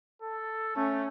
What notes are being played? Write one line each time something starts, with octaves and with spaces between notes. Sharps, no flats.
A4
A3 C#4